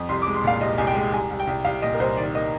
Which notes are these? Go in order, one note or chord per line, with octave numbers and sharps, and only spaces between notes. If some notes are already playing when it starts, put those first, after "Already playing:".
Already playing: F2
C2 C6
D6
G#3
C6
A#2 F5
C2 D#5
C2 G#5
G5
G#3
C2 G#5
C2
G5
C2
C2 F5
A#2 D#5
A#4
C2 C5
D#3 D5
A#3 D#5